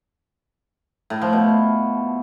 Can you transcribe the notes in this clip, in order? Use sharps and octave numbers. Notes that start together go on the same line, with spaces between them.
A2
F3
B2